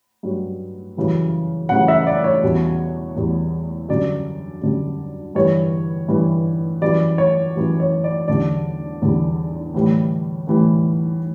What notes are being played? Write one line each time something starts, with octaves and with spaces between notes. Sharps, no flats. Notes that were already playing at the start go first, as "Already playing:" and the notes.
G2 F#3
F#2 C#3 E3 G3
F#2 C#3 E3 G3 F#5
E5
D5
C#5
E2 B2 G3
E2 B2 G3
F#2 D3 G3 D5
F#2 D3 G3
G2 E3 G3 C#5
G2 E3 G3
F#2 E3 G3 D5
C#5
F#2 E3 G3
C#5
D5
E2 D3 G3 D5
E2 D3 G3
A2 E3 G3
A2 E3 G3